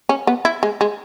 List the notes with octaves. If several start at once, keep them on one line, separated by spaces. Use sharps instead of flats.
C#4
B3
E4
G#3
G#3